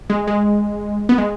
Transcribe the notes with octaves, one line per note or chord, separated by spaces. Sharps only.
G#3
G#3
B3
G#3